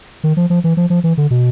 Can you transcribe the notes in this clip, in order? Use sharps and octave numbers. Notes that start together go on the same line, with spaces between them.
D#3
F3
F3
E3
F3
F3
E3
D3
B2